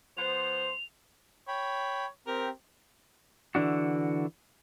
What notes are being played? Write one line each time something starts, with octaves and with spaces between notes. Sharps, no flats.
F3 B3 C5 F7
C#5 G5 B5
C4 G4 A#4
D3 E3 D4 F#4